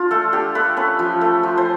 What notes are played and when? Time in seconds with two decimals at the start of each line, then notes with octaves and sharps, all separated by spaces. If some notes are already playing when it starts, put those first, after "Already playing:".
Already playing: D4 F4
0.11 A3 A4
0.33 D4 G4
0.55 A3 B4
0.77 C#4 B4
0.99 F3
1.21 A3
1.43 F3
1.58 C5